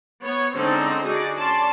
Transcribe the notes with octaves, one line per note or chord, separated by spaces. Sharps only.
B3 C#5
D3 G#3 C4 C#4 D#4
D#4 F#4 G#4 D5
C#4 D5 A5 C6